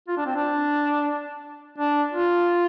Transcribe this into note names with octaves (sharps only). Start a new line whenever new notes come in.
F4
D4
C4
D4
D4
F4